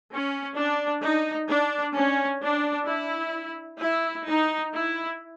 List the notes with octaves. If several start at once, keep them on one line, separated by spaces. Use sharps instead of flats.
C#4
D4
D#4
D4
C#4
D4
E4
E4
D#4
E4